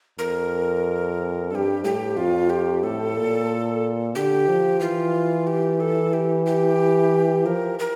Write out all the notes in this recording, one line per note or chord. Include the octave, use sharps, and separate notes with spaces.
F2 A#4
G2 G4 A4
A2 G4
F2 F4
G4
A2 A4
A#2
D3 G4
F3
E3 F4
G4
A4
G4
G4
F3 A#4
A#4